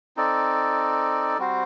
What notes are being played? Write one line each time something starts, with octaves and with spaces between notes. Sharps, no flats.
C4 D#4 A4 D5
G3 C4 F#4 C5